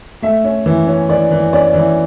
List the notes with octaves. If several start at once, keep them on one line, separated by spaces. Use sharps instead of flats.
A3 E5
C#4
E3
C#4
E3 D5
E3
C#4 D5
E3